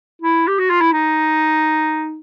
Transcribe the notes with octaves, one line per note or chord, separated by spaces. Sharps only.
E4
G4
F#4
F4
E4
D#4